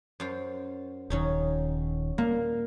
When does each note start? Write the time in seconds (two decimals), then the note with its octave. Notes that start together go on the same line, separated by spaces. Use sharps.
0.20 F#2 F4 C5
1.10 D#1 D#3 F#3 C#4 D#4
2.18 A#2 A#3